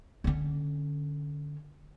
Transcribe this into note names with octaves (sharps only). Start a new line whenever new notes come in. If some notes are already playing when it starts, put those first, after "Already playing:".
D3 C#4